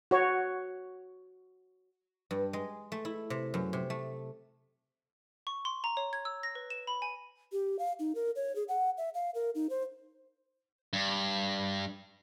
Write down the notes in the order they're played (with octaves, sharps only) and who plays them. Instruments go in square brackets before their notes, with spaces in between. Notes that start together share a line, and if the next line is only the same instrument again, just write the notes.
[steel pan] F#4 C#5
[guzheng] G2
G#3
A3
E4
C3
F#2
C3
A3
[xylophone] C#6
C6
A#5
C#5
G#6
E6
A#6
B4
E7
B5
G#5
[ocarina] G4
F5
D#4
A#4
C#5
G#4
F#5
E5
F5
A#4
D#4
C5
[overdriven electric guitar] G2